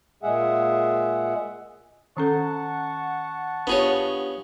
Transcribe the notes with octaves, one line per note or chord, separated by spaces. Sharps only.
A#2 G#3 G#4 E5 F#5
D#3 C#4 A4 F#5 A5 C#6
B3 D4 F4 G4 G#4 C#5